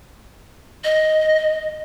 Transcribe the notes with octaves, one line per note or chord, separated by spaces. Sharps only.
D#5